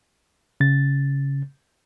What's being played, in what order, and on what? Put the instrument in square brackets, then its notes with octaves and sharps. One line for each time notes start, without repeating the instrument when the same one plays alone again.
[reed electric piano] C#3 A6